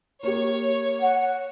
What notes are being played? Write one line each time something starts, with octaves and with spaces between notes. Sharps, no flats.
A#3 G4 C#5
F#5